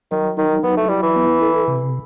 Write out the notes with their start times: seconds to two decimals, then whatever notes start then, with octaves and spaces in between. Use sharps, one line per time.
0.11 D#3 F#3
0.37 D#3 D#4
0.63 F#3 B3
0.77 A3
0.89 G3 E4
1.03 E3
1.16 B3
1.42 A4
1.68 C3